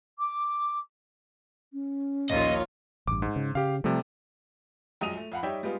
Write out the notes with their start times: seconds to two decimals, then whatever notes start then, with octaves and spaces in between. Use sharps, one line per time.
0.18 D6
1.73 C#4
2.30 A#1 D#2 A#2 F4 C#5 D#5
3.07 A1 G2 D6
3.22 G#2
3.36 C#3
3.55 C#3 G4 F5
3.84 C3 F3 G3 A3
5.01 A#1 F#2 G#3 D#6 D#7 F7
5.17 A3
5.32 F2 F5 F#5 B5
5.43 G3 D#4 C#5 D5 E5 G5
5.63 G3 G#3 B3 F4